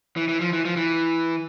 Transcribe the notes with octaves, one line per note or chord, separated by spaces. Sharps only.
E3
E3
F3
E3
F3
E3